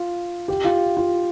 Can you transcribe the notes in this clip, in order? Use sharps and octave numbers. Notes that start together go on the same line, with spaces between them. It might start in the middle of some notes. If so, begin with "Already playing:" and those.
Already playing: F4
G4
F4
F4